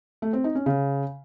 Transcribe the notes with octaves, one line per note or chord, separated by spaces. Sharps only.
A3
C4
D#4
C#4
C#3